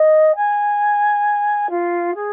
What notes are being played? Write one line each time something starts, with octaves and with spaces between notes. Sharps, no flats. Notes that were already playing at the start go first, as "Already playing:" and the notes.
Already playing: D#5
G#5
F4
G#4